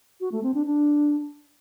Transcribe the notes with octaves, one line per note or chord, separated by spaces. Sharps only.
F#4
A3
C4
D4
D4